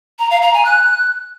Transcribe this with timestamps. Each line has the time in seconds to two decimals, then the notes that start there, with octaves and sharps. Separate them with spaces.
0.19 A#5
0.30 F5
0.42 A#5
0.54 G#5
0.65 F#6